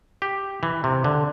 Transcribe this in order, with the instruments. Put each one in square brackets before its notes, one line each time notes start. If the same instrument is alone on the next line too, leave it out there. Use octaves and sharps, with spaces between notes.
[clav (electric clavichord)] G4
E3
C3
D3